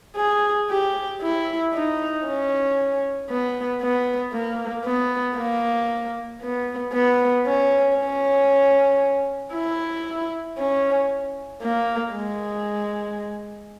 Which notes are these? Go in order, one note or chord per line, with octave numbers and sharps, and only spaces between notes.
G#4
G4
E4
D#4
C#4
B3
B3
A#3
B3
A#3
B3
B3
C#4
C#4
E4
C#4
A#3
G#3